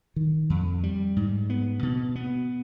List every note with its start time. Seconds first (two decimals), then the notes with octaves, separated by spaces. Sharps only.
0.16 D#3
0.50 F2
0.83 G3
1.17 G#2
1.50 B3
1.83 B2
2.16 B3